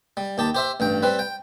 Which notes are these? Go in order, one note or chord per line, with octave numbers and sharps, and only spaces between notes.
G3
D#2 G4 A5
G4 C5 E5
A1 G2 G5
G3 C4 B4
G5